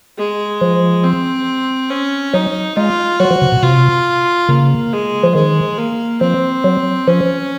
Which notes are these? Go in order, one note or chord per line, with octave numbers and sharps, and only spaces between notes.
G#3
F3
C4
C#4
F#3 D#4
G#3 F4
F#3 F#4
F3
C#3
A#2
C3 F4
C#3 A#3
G#3
F3
D#3 G#3
A#3
F3 C4
F#3
F3 C#4